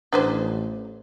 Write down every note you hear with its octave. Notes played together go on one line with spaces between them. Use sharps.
A1 D4 B4 C5